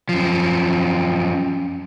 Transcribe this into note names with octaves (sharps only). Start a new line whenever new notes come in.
F#2 F3